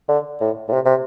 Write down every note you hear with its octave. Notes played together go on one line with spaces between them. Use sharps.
D3
A2
A2
C3
C3